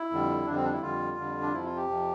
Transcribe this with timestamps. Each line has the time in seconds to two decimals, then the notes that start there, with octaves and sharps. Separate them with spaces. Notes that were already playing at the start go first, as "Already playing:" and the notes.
Already playing: E4
0.11 F2 D3 G3
0.46 F2 D3 G3 D4
0.56 C4
0.64 D4
0.73 E4
0.81 F2 D3 G3 F4
1.17 F2 D3 G3
1.41 D4
1.53 F2 C3 F3 E4
1.65 F4
1.76 G4
1.88 F2 C3 F3